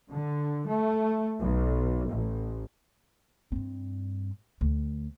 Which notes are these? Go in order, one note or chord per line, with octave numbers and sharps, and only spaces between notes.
D3
A3
B1
A1
G2 C4
D2